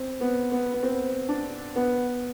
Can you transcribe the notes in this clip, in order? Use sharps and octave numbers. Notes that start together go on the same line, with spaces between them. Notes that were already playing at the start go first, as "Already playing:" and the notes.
Already playing: C4
B3
B3
B3
C4
D4
B3